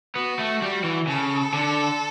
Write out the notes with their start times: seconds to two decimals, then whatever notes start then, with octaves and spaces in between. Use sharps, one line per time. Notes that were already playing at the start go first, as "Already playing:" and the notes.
0.16 B3 F#4
0.39 A3
0.62 G3
0.84 E3
1.07 C#3 A4
1.53 D3